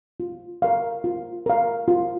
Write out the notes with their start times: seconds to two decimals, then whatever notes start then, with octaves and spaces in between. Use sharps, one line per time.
0.20 F4
0.62 A#4 F5
1.04 F4
1.46 A#4 F5
1.88 F4